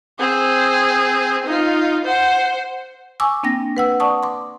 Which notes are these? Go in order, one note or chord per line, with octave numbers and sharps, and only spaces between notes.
C4 G#4
D#4 F4
C5 F#5
G#5 C#6 D6 E6
A#3 C4 D4 G5 A#6
B4 F#5 E6
D5 F#5 A5 C#6 D#6
C6 D6